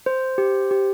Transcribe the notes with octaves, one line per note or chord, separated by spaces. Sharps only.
C5
G4
G4